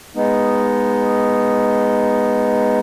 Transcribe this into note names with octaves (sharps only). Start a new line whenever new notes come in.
G#3 B3 D#4